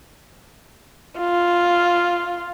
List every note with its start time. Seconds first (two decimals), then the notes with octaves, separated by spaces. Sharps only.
1.19 F4